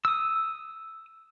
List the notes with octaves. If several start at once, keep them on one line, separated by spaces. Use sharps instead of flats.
D#6 E6